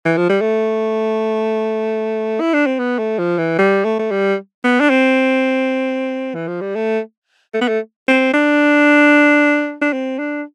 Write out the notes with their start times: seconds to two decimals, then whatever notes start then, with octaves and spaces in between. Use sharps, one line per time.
0.05 E3
0.17 F3
0.30 G3
0.41 A3
2.40 E4
2.54 D4
2.66 C4
2.79 B3
2.99 A3
3.19 F3
3.38 E3
3.58 G3
3.85 A3
3.99 A3
4.11 G3
4.64 B3
4.80 D4
4.90 C4
6.35 E3
6.48 F3
6.61 G3
6.76 A3
7.54 A3
7.61 B3
7.68 A3
8.08 C4
8.34 D4
9.82 D4
9.93 C4
10.19 D4